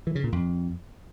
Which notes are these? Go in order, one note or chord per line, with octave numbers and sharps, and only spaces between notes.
E3
C#3
A#2
F2